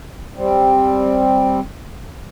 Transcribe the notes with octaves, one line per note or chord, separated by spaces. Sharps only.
G3 C4